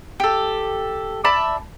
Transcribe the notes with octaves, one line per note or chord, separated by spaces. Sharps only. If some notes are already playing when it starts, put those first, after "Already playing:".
G4 A4
D5 E5 A5 B5